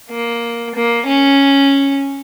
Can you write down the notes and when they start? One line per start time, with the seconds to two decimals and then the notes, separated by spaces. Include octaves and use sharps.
0.10 A#3
0.75 A#3
1.07 C#4